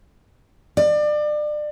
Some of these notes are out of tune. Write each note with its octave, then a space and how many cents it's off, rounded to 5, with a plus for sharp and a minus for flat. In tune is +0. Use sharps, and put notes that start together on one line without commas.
D5 +30